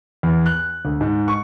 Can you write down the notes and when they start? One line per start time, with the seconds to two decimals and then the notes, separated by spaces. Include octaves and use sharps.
0.23 E2
0.46 F#6
0.85 D2
1.01 G#2
1.28 C#6